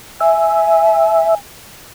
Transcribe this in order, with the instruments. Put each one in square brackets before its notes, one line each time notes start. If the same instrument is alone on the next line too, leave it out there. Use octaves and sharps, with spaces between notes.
[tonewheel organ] E5 [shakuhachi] G#5